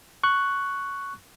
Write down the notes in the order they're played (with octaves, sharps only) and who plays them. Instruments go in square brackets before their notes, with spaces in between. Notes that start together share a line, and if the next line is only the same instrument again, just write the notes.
[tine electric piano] C#6 F#6